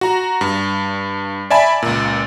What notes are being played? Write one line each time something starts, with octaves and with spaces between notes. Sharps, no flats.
F#4 A#5
G2
D5 E5 G#5 A5 B5
C#2 A#2